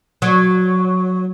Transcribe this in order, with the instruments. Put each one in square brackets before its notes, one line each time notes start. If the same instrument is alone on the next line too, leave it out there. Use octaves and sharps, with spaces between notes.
[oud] F#3